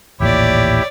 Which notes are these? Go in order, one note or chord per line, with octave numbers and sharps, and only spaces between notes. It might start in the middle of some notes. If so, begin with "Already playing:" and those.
D#1 A1 A#2 E4 G4 C#5 D5